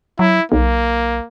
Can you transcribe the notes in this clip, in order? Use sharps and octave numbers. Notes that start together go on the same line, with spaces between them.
F#3 E4
B1 A#3